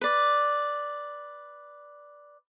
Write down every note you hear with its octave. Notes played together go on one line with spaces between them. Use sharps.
B4 D5